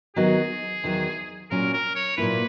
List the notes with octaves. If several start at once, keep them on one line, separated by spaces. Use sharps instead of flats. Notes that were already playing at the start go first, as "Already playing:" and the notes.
D#3 F#3 B3 F#4 G#4
E2 D#3 F#3
A#2 F#3 C#4 A#4
A#4
C#5
A#2 F#3 A#3 E4 B4